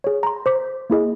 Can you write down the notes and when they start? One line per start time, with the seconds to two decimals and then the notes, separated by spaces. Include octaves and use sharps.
0.04 G#4 C#5
0.23 A#5 C6
0.46 C5 D6 B6
0.90 A#3 E4 G#4 D#5